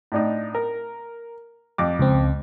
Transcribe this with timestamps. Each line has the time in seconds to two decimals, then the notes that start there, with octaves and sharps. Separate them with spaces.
0.12 A2 D4 D#4
0.55 A#4
1.78 F2 D6
1.99 C#2 C4